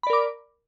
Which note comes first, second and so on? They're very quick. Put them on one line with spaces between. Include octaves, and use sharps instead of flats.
B5 D5 A#4 D6